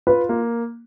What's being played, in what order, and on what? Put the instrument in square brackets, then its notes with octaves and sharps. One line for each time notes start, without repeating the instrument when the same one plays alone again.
[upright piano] F4 [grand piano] B4
[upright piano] A#3